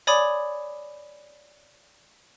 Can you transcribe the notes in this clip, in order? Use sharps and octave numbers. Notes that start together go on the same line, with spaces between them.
C#5 D5 G#5 B5 D6 D#6